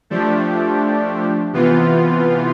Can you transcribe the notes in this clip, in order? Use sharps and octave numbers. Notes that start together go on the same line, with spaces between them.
F3 A3 D4 G4
C3 E3 B3 F4